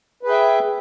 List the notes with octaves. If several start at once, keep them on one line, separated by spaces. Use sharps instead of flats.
G#4 B4 E5 G5